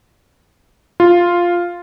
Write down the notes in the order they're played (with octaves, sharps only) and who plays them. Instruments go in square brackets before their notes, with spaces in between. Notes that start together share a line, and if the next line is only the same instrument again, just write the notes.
[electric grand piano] F4